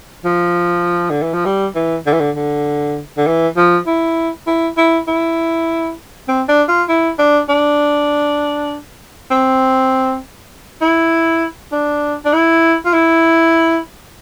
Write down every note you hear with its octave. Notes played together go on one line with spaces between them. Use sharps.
F3
D3
E3
F3
G3
E3
D3
E3
D3
D3
D3
E3
F3
E4
E4
E4
E4
C4
D4
F4
E4
D4
D4
C4
E4
D4
D4
E4
F4
E4